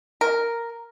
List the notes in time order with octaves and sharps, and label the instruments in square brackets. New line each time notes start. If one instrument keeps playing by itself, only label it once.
[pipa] A#4